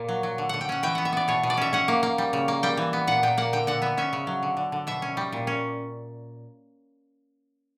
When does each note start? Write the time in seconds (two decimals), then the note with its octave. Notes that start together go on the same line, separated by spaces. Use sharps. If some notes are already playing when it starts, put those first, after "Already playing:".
Already playing: A#2 A#3
0.09 F#3
0.23 F#3
0.38 D3
0.49 D3 F#5
0.61 G5
0.69 C#4 F#5
0.83 E3 G5
0.95 B3 F#5
1.05 E5
1.13 B3 D5
1.28 B2 C#5
1.43 B2
1.50 D5
1.57 C#4 E5
1.73 C#4 F#5
1.88 A#3
2.03 A#3
2.18 G3
2.33 C#3
2.48 A#3
2.63 G3 G5
2.77 E3
2.93 B3
3.07 A#2 F#5
3.23 A#2 G5
3.38 A#3 F#5
3.53 D3 G5
3.67 D3 F#5
3.82 B3 E5
3.97 C#4 E5
4.13 C#3
4.27 F#3
4.43 D3
4.57 D3
4.72 D3
4.87 B2 E5
5.02 C#4
5.17 G3
5.32 A#2
5.47 C#4